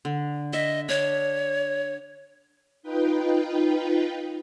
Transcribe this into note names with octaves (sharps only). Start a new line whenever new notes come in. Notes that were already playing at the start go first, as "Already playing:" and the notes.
D3
D#5 E5
D4 C#5
D#4 F4 B4 G5